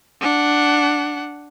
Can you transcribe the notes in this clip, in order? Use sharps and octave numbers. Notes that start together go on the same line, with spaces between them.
D4 F#5